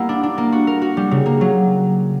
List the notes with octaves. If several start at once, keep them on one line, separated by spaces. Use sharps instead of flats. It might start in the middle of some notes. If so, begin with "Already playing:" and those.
Already playing: G3 A#3 B3 E4
D4
D4
A#3
F#4
A#4
F#4
G3
C#3
A#3
F#3